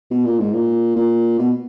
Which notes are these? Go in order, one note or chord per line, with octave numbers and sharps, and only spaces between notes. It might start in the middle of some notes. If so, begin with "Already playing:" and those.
B2
A#2
G#2
A#2
A#2
B2